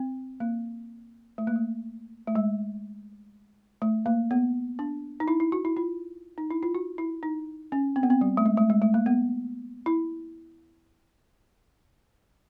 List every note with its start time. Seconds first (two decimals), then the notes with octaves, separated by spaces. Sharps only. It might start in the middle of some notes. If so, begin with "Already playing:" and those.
Already playing: C4
0.40 A#3
1.38 A3
1.47 A#3
1.56 A3
2.27 A3
2.35 G#3
3.82 A3
4.06 A#3
4.31 B3
4.79 D4
5.20 D#4
5.28 E4
5.40 E4
5.52 F#4
5.65 E4
5.77 F4
6.38 D#4
6.51 E4
6.63 F4
6.75 F#4
6.98 E4
7.23 D#4
7.72 C#4
7.96 C4
8.03 B3
8.10 C4
8.21 G3
8.37 A3
8.46 G#3
8.57 A3
8.70 G#3
8.82 A3
8.94 A#3
9.06 B3
9.86 E4